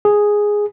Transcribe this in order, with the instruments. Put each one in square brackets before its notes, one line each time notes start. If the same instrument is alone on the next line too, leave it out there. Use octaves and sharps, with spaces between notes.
[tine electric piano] G#4